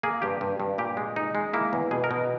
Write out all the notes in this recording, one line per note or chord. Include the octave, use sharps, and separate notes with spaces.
A#3 G#4
G2 G4
G2
G2
A#2 G4
G#3
D#4
G#3
A#3 E4
E2
B2 G#4
A#4
B2